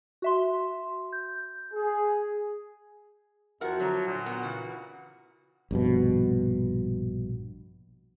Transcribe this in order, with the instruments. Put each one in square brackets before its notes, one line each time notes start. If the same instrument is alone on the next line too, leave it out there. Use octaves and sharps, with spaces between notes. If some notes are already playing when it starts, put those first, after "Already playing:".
[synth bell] F#4 E5 C6
G6
[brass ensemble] G#4
[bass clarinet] F2 [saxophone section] F3 E4 F#4 [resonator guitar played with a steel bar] A#4 F#5
[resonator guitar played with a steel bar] D3 A#5 [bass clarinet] F#3
[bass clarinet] A#2
[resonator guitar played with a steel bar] B3 [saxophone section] F#4 A#4 F#5
[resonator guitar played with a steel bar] C#3 E3
[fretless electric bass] A#1 G2 B2